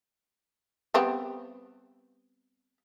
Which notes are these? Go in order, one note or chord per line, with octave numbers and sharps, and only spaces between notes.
G3 B3 C4